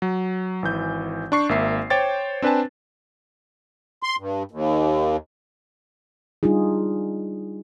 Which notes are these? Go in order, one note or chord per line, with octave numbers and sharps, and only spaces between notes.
F#3
G#1 E3 G6
D4 C#6 C7
G#1 A#3 E5 C7
C5 C#5 G5 D6 A6
C4 D4 B4 G#5 A5
C6
G2
D#2
G3 D4 D#4 F4 G#4